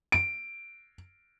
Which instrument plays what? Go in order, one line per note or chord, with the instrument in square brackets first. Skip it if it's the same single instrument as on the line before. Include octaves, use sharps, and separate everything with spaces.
[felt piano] D7